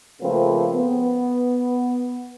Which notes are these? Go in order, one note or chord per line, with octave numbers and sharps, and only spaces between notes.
C#3 F3 A3 A#3 C4 B4
B3